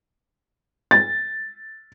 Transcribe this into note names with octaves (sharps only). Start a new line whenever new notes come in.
A6